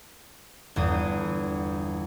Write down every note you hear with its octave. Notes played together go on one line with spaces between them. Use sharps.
G1 E2 D#6